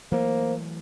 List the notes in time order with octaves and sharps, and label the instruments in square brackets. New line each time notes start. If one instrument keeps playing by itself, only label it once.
[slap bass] E3 F#3 A3 [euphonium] A#3 [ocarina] C5